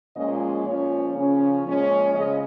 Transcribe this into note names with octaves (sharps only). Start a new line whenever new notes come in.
A#2 F3 G#3 C#4 D#5
A#2 F3 C#4 C#5
C#3 F3 C#4
A#2 F3 G#3 C#4
C#3 G#3 D#5